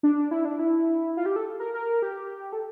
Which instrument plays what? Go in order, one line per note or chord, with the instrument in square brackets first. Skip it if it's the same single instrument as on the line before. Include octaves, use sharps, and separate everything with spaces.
[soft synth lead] D4
E4
D4
E4
F4
G4
A4
A#4
A#4
G4
A4